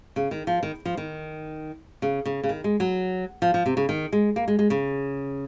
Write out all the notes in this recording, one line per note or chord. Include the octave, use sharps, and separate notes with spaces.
C#3
D#3
F3
D#3
F3
D#3
C#3
C#3
C#3
D#3
G#3
F#3
F3
F3
C3
C#3
D#3
G#3
A#3
G#3
G#3
C#3